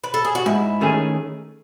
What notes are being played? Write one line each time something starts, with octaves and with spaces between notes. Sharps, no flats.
B4
A4
G#4
F#4
G#2 E4
D#3 A3 C#4 G#4